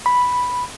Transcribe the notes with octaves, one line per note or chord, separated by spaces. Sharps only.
B5